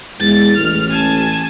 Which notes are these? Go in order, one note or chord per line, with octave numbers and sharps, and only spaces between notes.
E2 G#3 A6
A1 F6
G#5 A5